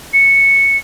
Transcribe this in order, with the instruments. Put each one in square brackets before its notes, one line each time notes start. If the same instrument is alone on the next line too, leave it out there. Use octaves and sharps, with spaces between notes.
[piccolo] C#7